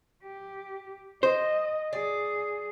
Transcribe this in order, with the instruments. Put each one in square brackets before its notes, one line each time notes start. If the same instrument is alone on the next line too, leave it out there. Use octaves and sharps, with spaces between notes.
[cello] G4
[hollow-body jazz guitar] C5 [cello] D#5
[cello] G#4 [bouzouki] D5